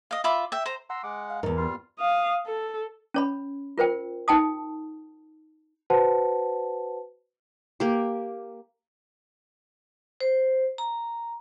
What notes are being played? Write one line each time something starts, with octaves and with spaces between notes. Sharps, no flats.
D#5 F5
F4 E5 B5 D6
E5 G5
C5 A#5
F#5 A#5 C6 E6
G#3 F#5 D6
F5
E2 G#2 A#4
G3 F4 F5
F5 D#6
A4
C#4 C#5 B5
F4 A#4 C5 G5
D#4 G5 A5 D#6
F#4 B4 C5 F#5 A5
A#3 G4
C5
A#5